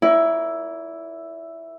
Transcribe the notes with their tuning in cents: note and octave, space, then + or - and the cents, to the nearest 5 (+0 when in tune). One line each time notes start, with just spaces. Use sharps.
E4 +0 A#4 +25 D5 -35